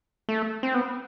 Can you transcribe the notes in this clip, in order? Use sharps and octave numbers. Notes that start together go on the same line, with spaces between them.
A3
C4
B3